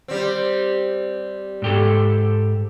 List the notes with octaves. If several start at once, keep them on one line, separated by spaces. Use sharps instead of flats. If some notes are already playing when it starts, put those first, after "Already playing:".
G3 C4
G#2 G4 A4